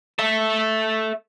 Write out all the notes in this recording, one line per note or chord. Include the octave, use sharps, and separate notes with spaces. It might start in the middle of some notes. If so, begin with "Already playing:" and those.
A4 E5